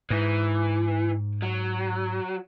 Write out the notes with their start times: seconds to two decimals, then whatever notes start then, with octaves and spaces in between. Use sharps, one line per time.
0.10 G#2 E3
1.42 F#3